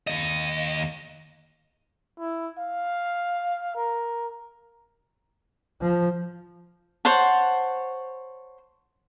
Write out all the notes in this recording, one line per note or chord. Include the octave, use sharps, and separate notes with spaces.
D#2 D#5
E4
F5
A#4
F3
C5 C#5 F#5 A5